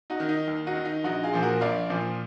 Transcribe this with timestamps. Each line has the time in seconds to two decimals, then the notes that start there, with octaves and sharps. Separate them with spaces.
0.10 D#4 F#4
0.20 D#3
0.29 D#4
0.47 D#2
0.67 D#4 F#4
0.76 D#3
0.85 D#4
1.04 A#1 D#4 F#4
1.23 F4 G#4
1.33 A#2 F3
1.42 F#4 A#4
1.61 A#1 D5 F5
1.90 A#2 F3